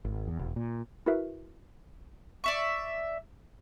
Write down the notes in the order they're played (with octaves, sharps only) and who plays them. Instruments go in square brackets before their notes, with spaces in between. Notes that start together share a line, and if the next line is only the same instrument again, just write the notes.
[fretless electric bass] G#1
E2
E1
A#2
[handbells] E4 F#4 A#4 B4 E5
[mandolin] D5 E5 C#6